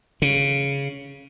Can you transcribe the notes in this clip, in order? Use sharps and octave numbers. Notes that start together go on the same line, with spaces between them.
C#3